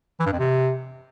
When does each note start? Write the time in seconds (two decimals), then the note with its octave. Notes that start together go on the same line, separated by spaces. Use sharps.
0.20 E3
0.26 G2
0.33 F2
0.39 C3